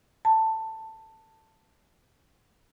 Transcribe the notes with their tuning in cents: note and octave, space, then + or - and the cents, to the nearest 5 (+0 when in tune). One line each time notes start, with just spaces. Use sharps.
A5 +10